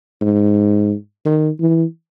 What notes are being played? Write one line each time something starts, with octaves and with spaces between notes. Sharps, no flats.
G#2
D#3
E3